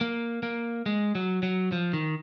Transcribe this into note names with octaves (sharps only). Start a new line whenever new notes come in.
A#3
A#3
G#3
F#3
F#3
F3
D#3